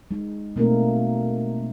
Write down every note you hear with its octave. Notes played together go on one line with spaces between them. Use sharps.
G#3 D#4
B2 A3 A#3 C4 D#4 A#4